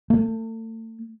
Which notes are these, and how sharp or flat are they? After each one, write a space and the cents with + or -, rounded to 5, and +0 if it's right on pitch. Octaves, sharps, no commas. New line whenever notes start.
A3 +35